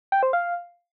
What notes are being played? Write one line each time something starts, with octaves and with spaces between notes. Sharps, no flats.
G5
C5
F5